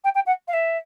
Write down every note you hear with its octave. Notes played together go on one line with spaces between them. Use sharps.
G5
G5
F#5
F5
E5